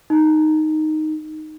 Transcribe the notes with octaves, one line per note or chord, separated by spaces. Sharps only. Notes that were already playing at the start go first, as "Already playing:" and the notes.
D#4